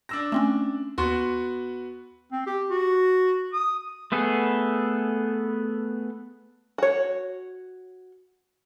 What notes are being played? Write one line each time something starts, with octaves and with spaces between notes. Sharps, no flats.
D4 E6 A#6
A3 C4 C#4
D#2 B3 F#4 C6 C#6
C4
G4
F#4
D#6
A3 B3 G#4 A4
F#4 C#5